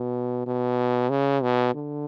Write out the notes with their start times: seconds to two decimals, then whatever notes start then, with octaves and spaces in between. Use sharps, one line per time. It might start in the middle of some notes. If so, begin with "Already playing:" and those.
Already playing: B2
0.46 B2
1.10 C#3
1.42 B2
1.75 D3